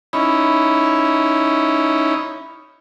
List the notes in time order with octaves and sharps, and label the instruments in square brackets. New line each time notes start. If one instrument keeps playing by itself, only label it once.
[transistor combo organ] C#4 D#4 E4 [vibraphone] B5